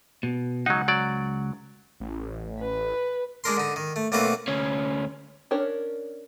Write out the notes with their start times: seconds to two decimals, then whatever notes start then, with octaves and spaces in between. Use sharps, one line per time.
0.23 B2
0.66 C#2 F#3 D#4 F#5
0.88 F#3 D5
2.00 A1
2.59 B4
3.44 G#3 D4 A#4 C6
3.57 D3 D#4
3.76 D#3
3.96 A3
4.12 B1 A3 A#3 C4 A4 B4
4.48 D2 C#4
5.51 C#4 D4 A#4 C#5